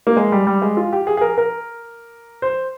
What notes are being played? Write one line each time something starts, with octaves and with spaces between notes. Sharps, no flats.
A#3
G#3
G3
G3
G#3
F4
G4
G#4
G#4
A#4
A#4
C5